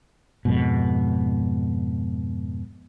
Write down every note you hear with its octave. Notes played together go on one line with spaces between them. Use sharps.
F2 G#2 B2